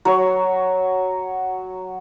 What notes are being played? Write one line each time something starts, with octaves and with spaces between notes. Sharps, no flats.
F#3 C#5